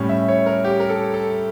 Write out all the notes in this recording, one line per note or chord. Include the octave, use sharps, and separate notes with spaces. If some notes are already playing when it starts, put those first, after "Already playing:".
Already playing: A2 G3 C#4
E5
C#5
A#4
G4
A#4
A4
A4